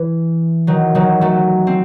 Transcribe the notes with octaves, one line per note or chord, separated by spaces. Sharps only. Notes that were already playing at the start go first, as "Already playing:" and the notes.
Already playing: E3
D#3 F#3
D#3 F#3
F#3 A3
C4